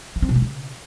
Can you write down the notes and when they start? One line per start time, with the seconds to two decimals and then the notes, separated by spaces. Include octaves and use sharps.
0.16 A3
0.22 C4
0.29 B2
0.35 G#3
0.42 C#3